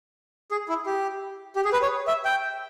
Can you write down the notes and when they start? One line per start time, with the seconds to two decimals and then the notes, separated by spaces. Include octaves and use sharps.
0.51 G#4
0.69 E4
0.86 G4
1.56 G4
1.65 G#4
1.73 B4
1.82 C#5
2.08 E5
2.25 G5